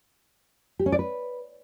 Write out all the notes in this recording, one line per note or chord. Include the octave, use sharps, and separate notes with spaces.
G4
C#4
D5
B4